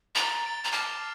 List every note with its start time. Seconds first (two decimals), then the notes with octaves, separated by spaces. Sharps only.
0.15 A#5 A6 D7 G7
0.44 A6 D7 G7
0.64 A#5
0.72 A5 D6 F6 C7 F7